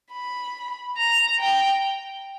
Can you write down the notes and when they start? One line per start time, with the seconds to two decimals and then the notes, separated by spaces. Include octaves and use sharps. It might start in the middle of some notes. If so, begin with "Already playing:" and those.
0.12 B5
0.97 A#5
1.39 G5